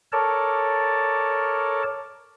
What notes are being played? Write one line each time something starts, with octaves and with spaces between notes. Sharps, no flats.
A4 A#4 C#5 D5 A5